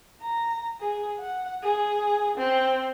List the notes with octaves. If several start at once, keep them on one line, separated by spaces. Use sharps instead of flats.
A#5
G#4
F#5
G#4
C4